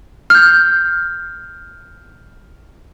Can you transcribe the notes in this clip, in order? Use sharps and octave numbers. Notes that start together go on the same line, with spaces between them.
F6 G6